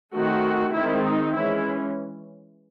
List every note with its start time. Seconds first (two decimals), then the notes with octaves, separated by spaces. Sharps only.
0.13 D#3 A3 C4 F#4
0.74 D#3 G#3 C4 E4
1.04 D#4
1.34 E3 G#3 C#4 E4